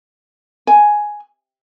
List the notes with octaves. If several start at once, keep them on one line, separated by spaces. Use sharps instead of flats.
G#5